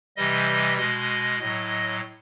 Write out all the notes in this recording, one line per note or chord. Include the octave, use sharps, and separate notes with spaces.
C3 E3 G3 D#5
B2 G#3 D#5
A2 F#3 D#5